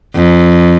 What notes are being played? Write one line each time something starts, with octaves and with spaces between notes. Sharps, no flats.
F2